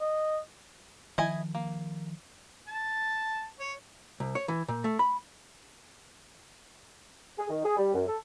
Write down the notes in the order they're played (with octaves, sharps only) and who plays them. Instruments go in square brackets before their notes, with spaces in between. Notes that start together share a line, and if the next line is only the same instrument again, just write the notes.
[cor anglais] D#5
[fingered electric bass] D#3 F3 [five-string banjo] E4 D#5 G#5
[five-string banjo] A#3
[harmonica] A5
C#5
[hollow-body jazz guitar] C2
C#5
E3
A#2
A3
B5
[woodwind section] G#4
D#3
G#4
G3
F#2
A4